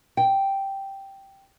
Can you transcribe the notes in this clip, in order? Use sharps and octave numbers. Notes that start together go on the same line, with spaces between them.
G5